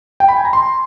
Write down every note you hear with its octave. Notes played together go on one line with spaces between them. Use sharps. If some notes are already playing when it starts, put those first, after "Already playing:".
G5
B5
G#5
A#5
C6